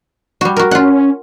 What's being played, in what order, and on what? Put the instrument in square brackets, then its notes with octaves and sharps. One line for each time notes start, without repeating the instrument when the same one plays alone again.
[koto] G3 F#4
F#4 A#4
[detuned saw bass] C#4 [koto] F4 F#5